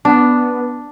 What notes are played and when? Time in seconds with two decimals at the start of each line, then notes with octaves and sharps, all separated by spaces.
0.05 B3 D4